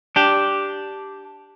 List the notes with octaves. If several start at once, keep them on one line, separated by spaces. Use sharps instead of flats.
D4 G4